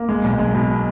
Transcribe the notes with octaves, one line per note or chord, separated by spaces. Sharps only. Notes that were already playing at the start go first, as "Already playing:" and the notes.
Already playing: A#3
G#3
B1
G#3
B2